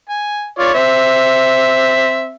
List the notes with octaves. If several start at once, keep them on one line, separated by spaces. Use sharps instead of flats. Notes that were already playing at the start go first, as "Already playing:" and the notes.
G#5
F4 C#5 D5
C4 E5